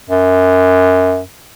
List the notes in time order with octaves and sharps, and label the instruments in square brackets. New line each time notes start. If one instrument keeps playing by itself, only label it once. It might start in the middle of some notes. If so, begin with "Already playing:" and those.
[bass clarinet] F#2